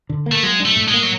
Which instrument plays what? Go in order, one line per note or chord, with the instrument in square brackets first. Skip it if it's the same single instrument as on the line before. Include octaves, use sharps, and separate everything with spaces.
[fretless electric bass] D3
A#3
[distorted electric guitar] A3
[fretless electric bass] F#3 [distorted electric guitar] G#3
[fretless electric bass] D4
[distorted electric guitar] A3
[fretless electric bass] A2
[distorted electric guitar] G#3
[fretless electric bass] A#3
[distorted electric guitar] F#3